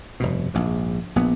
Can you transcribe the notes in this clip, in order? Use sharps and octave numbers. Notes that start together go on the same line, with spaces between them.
F1 G2 B2
A#1 G#2
A#1 B3